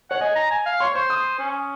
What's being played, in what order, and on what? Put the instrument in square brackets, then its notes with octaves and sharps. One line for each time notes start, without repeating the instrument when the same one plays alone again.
[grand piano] C#5 [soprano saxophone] F#5
[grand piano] D#5 [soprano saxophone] G#5
[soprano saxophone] A#5
G#5
F5
[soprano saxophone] C#5 [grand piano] C6
[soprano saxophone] C5 [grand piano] C#6
[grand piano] D#6
[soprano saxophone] C#4